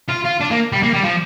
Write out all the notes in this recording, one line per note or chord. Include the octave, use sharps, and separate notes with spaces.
F4
F4
D4
A#3
G3
A#3
G3
F3